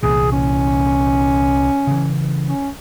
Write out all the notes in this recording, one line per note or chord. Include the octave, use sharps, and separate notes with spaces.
C2 A#2 E3 G#4
C#4
C#3 E3
C#4